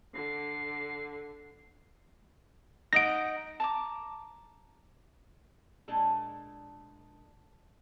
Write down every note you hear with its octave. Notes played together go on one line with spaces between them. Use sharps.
D3 C7
D#4 D#5 F#5 A#6 D7
A5 A#5 D6
A#2 G#3 D4 A4